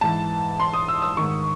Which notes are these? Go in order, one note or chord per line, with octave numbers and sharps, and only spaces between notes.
G#2 E3 A5
C6
D#6
E6
E6
G#2 D#3 C#6